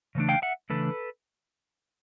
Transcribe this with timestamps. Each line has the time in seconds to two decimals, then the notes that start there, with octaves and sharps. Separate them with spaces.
0.15 C#3 E3 A3 D4
0.29 F5 G5
0.42 E5 F#5
0.70 C#3 E3 A3 D4 A4 B4